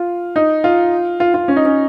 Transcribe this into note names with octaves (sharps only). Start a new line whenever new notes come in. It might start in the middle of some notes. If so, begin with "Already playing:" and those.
Already playing: F4
D#4
F4
F4
F4
C#4
D#4
C#4